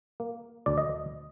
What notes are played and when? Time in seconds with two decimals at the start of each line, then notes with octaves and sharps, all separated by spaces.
0.20 A#3
0.66 D2 D5
0.78 D#5